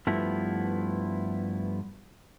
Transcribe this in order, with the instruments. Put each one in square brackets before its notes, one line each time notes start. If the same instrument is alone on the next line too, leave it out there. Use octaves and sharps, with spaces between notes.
[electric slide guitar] G2 F3 A3 B3 E4